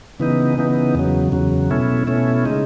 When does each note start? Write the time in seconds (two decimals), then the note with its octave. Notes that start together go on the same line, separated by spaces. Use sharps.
0.19 C#3 E3 B3 D#4
0.58 C#3 E3 B3 D#4
0.95 E2 C#3 F#3
1.32 E2 C#3 F#3
1.71 B2 A3 C#4 E4
2.07 B2 A3 C#4 E4
2.45 C#3 G#3 D#4